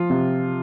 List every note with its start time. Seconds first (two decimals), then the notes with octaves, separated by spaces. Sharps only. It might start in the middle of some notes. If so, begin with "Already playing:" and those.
Already playing: F3 F4
0.10 C3